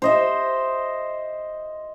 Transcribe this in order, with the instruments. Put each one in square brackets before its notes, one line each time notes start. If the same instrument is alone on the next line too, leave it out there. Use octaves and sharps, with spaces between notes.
[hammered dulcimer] C5 D#5 E5